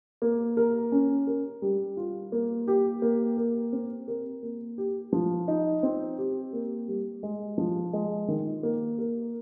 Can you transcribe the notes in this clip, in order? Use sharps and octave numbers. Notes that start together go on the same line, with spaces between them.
A#3
A#4
C#4
A#4
G3
F4
A#3
G4
A#3
A#4
C4
A#4
A#3
G4
F3
D#4
C4
G4
A#3
G3
G#3
F3
G#3
D#3
A#3
A#4